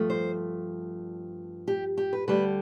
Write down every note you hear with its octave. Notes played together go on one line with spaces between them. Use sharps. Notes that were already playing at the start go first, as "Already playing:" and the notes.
Already playing: G2 F3 A3
C5
G4
G4
B4
D2 D3 G3 B4